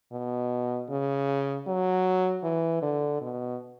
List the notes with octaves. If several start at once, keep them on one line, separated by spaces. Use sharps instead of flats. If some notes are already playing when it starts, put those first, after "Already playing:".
B2
C#3
F#3
E3
D3
B2